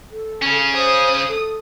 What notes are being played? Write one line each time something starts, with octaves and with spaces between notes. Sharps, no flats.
A4
C#3 C#4
C5 D#6
A4